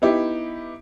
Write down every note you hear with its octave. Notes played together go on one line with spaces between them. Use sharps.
B3 D#4 E4 G4